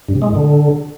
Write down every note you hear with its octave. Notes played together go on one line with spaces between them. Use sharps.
G2
C3
G#3
A2
D3